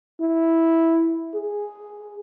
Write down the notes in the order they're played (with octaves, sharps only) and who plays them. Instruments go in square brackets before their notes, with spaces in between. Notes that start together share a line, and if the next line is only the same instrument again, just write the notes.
[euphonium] E4
G#4